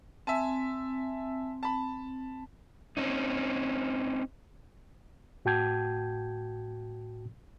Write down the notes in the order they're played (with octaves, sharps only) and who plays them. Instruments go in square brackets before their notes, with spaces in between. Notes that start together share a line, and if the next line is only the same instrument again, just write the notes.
[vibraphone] C4 [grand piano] E5 G#5 A5
[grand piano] A5 B5
[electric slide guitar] C4 C#4 D#4
[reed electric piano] A2 F#4 G5 A5 G6 G#6